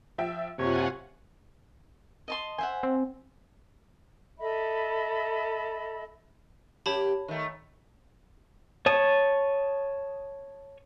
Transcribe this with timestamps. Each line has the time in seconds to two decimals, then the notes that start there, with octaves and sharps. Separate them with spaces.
0.18 F3 E5 G5
0.59 F#1 C3 F4 C#5 F#5 G#5
2.28 D#5 A5 C6
2.58 C5 E5 F#5 G#5
2.83 C4
4.39 A4 D#5 E5 B5
6.86 F#2 G4 C#5 A5 B5
7.28 D#3 A3
8.86 C#5 A5 D#6